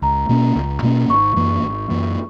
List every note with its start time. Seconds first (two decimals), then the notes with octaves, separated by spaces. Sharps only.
0.02 C#2 A#5
0.29 B2 A#3 C#4
0.56 C#2
0.82 B2 A#3 C#4
1.09 G#1 C#6
1.36 F#2 E3 A#3
1.63 G#1
1.90 F#2 E3 A#3